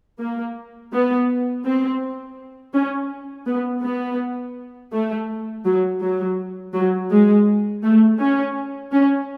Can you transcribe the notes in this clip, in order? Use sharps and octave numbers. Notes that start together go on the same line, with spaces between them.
A#3
B3
C4
C#4
B3
B3
A3
F#3
F#3
F#3
G#3
A3
C#4
C#4